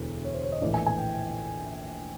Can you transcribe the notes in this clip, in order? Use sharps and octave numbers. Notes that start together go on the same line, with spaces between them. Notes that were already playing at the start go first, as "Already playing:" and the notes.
Already playing: E1 D2 E3
C#5
C5
C#5
D#5
A#1 A2 E3 D5
G#5
G#5
G5